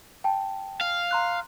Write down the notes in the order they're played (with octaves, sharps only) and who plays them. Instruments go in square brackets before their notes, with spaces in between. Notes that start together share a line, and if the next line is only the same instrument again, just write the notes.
[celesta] G5 A5
[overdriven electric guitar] F5
[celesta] A#5 C6 F#6